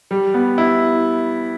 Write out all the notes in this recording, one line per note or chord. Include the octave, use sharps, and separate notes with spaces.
G3
B3
E4